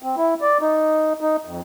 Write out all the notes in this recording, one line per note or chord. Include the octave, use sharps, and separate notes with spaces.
C4
E4
D5
D#4
D#4
F2